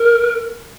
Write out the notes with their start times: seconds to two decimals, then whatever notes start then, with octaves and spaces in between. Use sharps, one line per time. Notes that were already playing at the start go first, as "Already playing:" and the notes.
Already playing: A#4